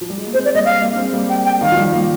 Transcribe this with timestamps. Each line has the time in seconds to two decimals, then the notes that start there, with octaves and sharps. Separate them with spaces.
0.01 F3
0.10 G3
0.18 G#3
0.26 A#3
0.34 G#3 C4 C5
0.45 D5
0.55 G3 A#3 D#5
0.65 F5
0.82 G3 A#3
0.92 D4
0.97 G#3 C4
1.13 G3 A#3
1.29 G5
1.45 G5
1.61 D#3 G3 F5
1.72 F3
1.77 D#3 G3
1.93 G3 A#3